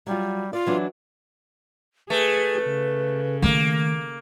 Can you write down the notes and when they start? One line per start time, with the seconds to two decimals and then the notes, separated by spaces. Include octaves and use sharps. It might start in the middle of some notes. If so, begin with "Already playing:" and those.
0.07 F#3 G3 F4
0.53 F4 D5
0.66 E3 F#3 D4
2.10 A3 G#4 B4
2.64 C#3
3.42 D#3 A3 A#3